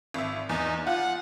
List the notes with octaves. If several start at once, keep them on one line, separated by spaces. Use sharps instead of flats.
G#1 E5
E2 D#4
F4 F#5